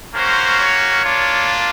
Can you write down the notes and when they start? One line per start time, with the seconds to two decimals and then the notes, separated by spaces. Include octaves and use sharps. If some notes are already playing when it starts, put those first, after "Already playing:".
0.15 A#3 C#4 F#4 C5
0.59 C#5
1.03 A#3 D4 F4